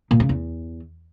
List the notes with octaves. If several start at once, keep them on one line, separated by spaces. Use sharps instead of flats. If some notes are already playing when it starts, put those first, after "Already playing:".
A#2
C#3
E2